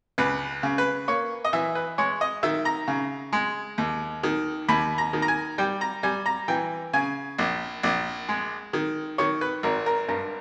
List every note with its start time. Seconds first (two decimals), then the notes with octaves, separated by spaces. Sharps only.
0.18 C#2 B4
0.63 C#3
0.78 B4
1.08 A#3 C#5
1.44 D#5
1.53 E3 E5
1.75 B4
1.98 G#3 C#5
2.21 D#5
2.43 D#3 E5
2.65 A#5
2.88 C#3
3.33 G#3
3.78 D#2
4.23 D#3
4.68 D#2 B5
4.98 A#5
5.13 D#3
5.22 A#5
5.28 G#5
5.58 G3 G5
5.81 A#5
6.03 G3 G#5
6.26 A#5
6.48 E3 G5
6.93 C#3 G#5
7.38 A#1
7.83 A#1
8.29 G#3
8.73 D#3
9.18 D#3 C#5
9.41 B4
9.63 G#1 A#4
9.86 A#4
10.08 G2 A#4